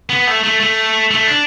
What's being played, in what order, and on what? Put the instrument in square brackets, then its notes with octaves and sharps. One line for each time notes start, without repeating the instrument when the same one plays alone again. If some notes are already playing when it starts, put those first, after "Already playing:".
[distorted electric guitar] B3
A3
A3
A3
A3
D4